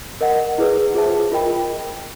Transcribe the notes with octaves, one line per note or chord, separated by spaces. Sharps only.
A#4 D#5 F#5
E4 G#4 B4
F4 G#4 C5 E5 A5
F4 A#4 D#5 G5 B5